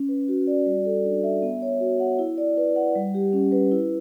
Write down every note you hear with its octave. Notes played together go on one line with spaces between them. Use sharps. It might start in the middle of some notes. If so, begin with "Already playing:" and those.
Already playing: C#4
B4
F#4
D5
G3
A4
D4
E5
B3
C#5
F#4
F#5
E4
D5
B4
F#5
G3
G4
C#4
B4
E4